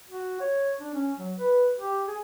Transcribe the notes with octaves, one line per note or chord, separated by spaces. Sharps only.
F#4
C#5
D4
C#4
F#3
B4
G4
G#4